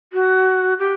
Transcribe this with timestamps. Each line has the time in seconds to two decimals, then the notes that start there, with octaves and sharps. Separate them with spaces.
0.13 F#4
0.79 G4